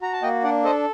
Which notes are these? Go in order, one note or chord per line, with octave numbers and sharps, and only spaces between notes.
F#4 A#5
A5
A#3 D#5 G5
D4 D5 F#5
A4 C5 D#5